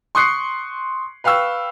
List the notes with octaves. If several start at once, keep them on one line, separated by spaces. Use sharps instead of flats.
C6 C#6 D#6 F#6 C7 C#7
B4 F5 G5 C#6 E6